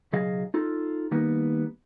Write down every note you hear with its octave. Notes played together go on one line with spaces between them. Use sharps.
B1 C#3 F#3 G#4 D#5 F5
D#4 F4 A4
D#3 G3 A#3 B3 D#4